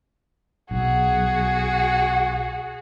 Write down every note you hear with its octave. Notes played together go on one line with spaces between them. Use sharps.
B1 F#4 G#4